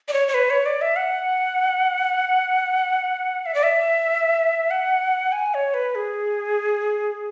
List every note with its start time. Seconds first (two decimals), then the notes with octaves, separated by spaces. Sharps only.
0.08 D5
0.13 C#5
0.28 C#5
0.34 B4
0.50 C#5
0.66 D5
0.82 E5
0.96 F#5
3.46 E5
3.54 D5
3.63 E5
4.71 F#5
5.32 G#5
5.54 C#5
5.74 B4
5.95 G#4